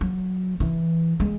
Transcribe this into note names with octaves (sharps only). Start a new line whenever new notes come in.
F#3
E3
G#3